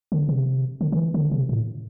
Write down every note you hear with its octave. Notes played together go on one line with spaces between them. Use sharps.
D3
C3
D3
D3
E3
D3
C3
A2